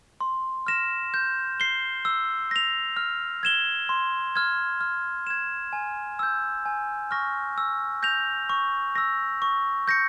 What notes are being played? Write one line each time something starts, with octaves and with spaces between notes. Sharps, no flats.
C6
F6 A#6 E7
G6
C7 G7
E6
A#6 F7
F6
G#6 E7 G7
C6
F6 G#6
F6
G#6 E7
G#5
E6 G6
G#5
C#6 F6 A#6
E6
G6 A#6 F7
C#6
E6 A#6
C#6
G6 A#6 C#7